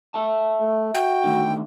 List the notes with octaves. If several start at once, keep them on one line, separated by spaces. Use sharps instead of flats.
A4 E5 A5
A3
F#4 G5
D3 D#3 A3